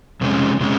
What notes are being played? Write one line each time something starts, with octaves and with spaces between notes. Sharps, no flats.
F2 C3 F3 G#3 C#4
C3 F3 G#3 C#4